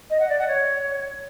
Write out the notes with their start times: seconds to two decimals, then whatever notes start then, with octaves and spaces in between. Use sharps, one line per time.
0.10 D#5
0.19 F#5
0.29 D5
0.38 F#5
0.48 C#5